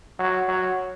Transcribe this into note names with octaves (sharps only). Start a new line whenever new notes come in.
F#3
F#3